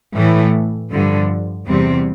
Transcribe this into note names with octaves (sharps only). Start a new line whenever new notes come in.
A2 E3 A3
G2 D3 F3
E2 C3 G3 C4